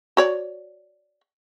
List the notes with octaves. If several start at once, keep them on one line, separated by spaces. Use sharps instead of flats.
F#4 C#5 D5